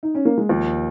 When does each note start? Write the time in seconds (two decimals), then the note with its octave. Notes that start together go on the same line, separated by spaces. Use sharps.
0.03 D#4
0.15 C#4
0.25 A#3
0.38 G#3
0.49 D#2 F3